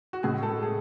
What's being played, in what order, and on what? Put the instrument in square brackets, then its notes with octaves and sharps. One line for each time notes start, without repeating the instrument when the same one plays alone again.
[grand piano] F#4
A2 G#3 G#4
A4
G#4